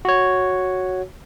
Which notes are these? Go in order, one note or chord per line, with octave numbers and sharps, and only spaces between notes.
F#4 C#5